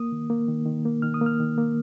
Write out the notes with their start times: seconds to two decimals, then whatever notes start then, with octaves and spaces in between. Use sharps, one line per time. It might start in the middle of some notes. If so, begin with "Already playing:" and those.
Already playing: A#3 D#6
0.12 D#3
0.30 A#3
0.48 D#3
0.66 D#3
0.85 A#3
1.02 D#3 F6
1.14 D#6
1.21 A#3
1.26 F6
1.40 D#3
1.58 A#3